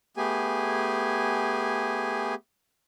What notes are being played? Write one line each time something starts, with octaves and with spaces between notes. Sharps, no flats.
A3 B3 G4 G#4 G#5